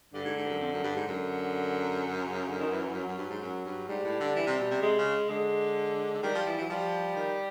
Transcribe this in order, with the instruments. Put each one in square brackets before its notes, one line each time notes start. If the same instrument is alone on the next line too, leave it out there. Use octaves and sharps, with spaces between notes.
[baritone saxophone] G2 [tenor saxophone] D3
[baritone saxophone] G#2
G#2
G2
F#2
F2
F#2
G2
G#2
[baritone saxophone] F#2 [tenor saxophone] D3
[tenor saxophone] C#3
D3
D#3
E3
E3
F#3
[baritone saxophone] F#2
G2
G#2
F#2
G2
[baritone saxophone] G#2 [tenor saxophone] G3
[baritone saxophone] A2
D3
E3
C3
B2
C3
[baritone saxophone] C3 [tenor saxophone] G#3
[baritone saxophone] C#3
[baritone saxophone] D3 [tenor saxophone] G#3
[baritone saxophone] D3
[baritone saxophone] D#3 [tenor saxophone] G3
[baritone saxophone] F3
E3
[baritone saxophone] E3 [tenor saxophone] F#3
[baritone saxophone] F3 [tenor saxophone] G3
[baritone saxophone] D#3